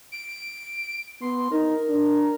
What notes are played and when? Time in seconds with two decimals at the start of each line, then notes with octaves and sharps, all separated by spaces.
0.12 D7
1.21 B3 C6
1.52 D#4 A#4
1.90 D4